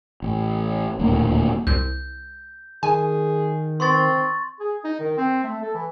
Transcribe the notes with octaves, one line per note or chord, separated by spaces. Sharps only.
A1
D#1 D2 A2 A#3
C2 G6
D#3 G#4 G#5
C4 C6 C#6 A6
G#4
D#4
D#3
C4
A3
A4
E3